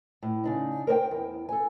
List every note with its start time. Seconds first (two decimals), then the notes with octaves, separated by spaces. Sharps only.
0.23 A2
0.44 C#3 D4 D#4
0.87 A#4 C5 D5 G5
1.11 E2
1.49 A4 G#5